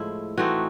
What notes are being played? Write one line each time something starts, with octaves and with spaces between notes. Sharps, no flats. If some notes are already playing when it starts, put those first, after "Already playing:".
Already playing: A2 F3 G#3 E4
E3 A3 C4 D#4 F#4